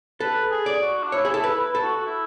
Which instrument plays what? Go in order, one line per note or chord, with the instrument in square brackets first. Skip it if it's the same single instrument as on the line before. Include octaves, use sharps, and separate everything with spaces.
[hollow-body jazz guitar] A4 [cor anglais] B4
[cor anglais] G#4
[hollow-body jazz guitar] D5
[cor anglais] F#4
D4
[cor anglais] E4 [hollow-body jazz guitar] C#5
[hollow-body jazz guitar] G#4
[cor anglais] E4 [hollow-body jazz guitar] A4
[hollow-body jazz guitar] B4
[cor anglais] E4
[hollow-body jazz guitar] A4
[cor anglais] F#4
F#4
E4